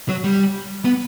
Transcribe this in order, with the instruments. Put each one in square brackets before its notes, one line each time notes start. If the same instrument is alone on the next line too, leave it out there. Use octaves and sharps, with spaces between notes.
[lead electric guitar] F#3
G3
B3